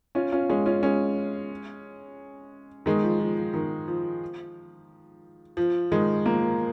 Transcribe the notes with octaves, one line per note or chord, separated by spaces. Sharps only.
C#4 F4
C#4 F4
G#3 C#4
C#4 F4
G#3 C#4
D#3 G#3
F3
F3
F3
D#3
F3
F3
D#3 G#3
F3 A#3